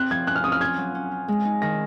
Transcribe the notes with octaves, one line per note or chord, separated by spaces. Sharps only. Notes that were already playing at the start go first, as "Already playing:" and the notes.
Already playing: C4 F#6
F3 G#6
C#4 F#6
F6
C#4 D#6
F6
F4 G#6
F#3
C#4
F4
G#3
D#4
D#3 A#6